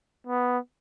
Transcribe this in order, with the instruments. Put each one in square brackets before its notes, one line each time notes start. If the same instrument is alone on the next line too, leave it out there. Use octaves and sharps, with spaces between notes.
[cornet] B3